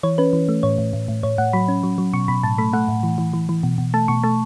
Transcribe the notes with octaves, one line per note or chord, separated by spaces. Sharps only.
E3 C#5
C#4 B4
E3
A3
A2 C#5
A2
A2
A2
A2 C#5
A2 F#5
F#3 B5
C#4
F#3
F#3
B2 C#6
B2 B5
A2 A5
A3 B5
A3 F#5
A2
E3
E3
E3
E3
B2
B2
A3 A5
B2 C#6
A3 A5